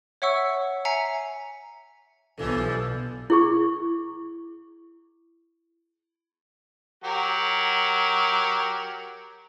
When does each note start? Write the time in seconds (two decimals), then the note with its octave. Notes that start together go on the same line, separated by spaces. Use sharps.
0.22 C#5 E5 F#5 C#6 E6
0.85 E5 G#5 A#5 C7 C#7
2.38 B1 G2 E3 F3 A4
3.30 E4 G#4 C#6
7.04 F#3 G4 A#4